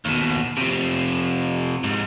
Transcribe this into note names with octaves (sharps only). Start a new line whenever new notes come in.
D#2 B2
C3 F3
G#2